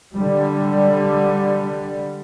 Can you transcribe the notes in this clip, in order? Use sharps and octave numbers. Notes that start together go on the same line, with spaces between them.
D3 G3